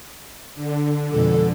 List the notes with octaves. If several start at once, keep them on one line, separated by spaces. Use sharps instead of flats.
D3
F2 B2 G#3 A4